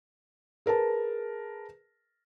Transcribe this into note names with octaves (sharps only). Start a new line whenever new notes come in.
G#4 A#4 B4 A5